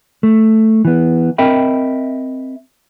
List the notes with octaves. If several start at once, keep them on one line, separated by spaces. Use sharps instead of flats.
A3
E3 B3
C4 A#4 D#5 E5 G5 B5